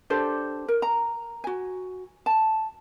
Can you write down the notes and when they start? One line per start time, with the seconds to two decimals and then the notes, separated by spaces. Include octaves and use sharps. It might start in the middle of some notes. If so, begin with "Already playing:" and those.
0.10 D4 G4 A4 C5
0.68 A#4
0.82 A#5
1.44 F#4 G#5
2.26 A5